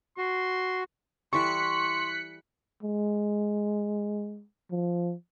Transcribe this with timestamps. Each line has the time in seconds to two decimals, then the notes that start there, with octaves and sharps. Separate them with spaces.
0.18 F#4 C6
1.33 E3 G3 A4 C6 C#6 F#6 B6 C#7
2.83 G#3
4.71 F3